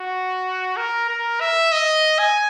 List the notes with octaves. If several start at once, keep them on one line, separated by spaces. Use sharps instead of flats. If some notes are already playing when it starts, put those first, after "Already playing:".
Already playing: F#4
A#4
A#4
E5
D#5
G#5